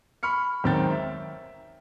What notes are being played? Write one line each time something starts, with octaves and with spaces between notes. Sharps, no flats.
B5 C#6 F6 C#7
G#1 F#2 D#3 C4 G5 A6
E5